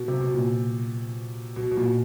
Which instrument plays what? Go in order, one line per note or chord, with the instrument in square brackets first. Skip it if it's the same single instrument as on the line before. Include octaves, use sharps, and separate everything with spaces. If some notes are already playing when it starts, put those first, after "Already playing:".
Already playing: [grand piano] B2
C3
B2
A#2
B2
B2
A#2